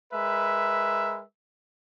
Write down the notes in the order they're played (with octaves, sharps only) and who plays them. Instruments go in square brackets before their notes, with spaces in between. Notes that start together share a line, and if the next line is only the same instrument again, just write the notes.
[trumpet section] G#3 A#4 B4 E5